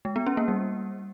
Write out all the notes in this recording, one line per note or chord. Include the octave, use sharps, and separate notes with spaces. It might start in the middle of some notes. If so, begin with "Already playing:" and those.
G#3
B3
C#4
A#3
G3